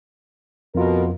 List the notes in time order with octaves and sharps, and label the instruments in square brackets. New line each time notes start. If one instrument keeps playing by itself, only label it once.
[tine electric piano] F2 F4 [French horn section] B2 A#4